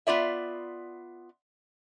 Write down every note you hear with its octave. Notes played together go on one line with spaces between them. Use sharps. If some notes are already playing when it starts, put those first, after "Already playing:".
B3 F4 D5 E5